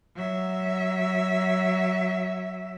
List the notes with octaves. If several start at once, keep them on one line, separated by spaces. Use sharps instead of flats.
F#3 E5